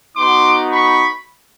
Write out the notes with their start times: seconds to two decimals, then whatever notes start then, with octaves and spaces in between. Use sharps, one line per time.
0.16 B3 D#4 F#4 C6 D6
0.70 B5 C#6